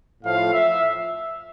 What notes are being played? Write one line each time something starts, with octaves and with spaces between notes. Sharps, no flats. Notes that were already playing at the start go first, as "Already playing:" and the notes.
A2 F3 F5
E5